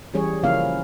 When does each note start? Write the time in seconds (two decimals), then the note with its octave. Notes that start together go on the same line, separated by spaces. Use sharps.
0.14 E3 G3 C#4 G#4 C#5
0.43 C#3 F3 A#3 C#4 E4 F5